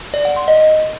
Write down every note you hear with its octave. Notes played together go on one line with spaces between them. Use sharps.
D5
F#5
C6
D#5